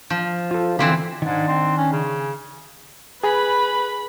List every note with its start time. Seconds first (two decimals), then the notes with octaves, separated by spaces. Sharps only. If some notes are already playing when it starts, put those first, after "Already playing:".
0.10 F3
0.51 F4 A4
0.79 D3 E3 C4 F5 B5
1.22 G#2 D#3 D4
1.48 C4
1.77 C#4
1.93 C#3
3.24 G#4 B4 G#5 B5